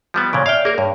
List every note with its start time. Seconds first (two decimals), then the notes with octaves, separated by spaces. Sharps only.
0.14 F3 G3 B3
0.33 A#2 C#3 C#5 G#6 D7
0.46 D5 E5 F5 G5 F6
0.65 A#3 G#4 A#4
0.78 G2 C#5